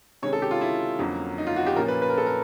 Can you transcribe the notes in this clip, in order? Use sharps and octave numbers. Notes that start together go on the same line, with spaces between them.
C3 D#3 G#3 C#4 C#5
A4
G4
F4
E4
F2 D3 F#3 A#3 C#4
D#4
F4
F#4
G4
A#2 F3 A#3 C#4 A#4
B4
B4
A#4
A4
A#4